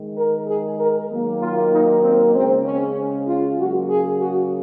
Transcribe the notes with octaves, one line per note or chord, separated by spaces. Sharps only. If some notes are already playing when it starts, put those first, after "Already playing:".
Already playing: D#3 G#3
A#4
G#4
A#4
D#3 F#3 A#3
F4
D#4
C4
C#3 G#3 C4
C#4
F4
C#3 F#3 A#3 F#4
G#4
F#4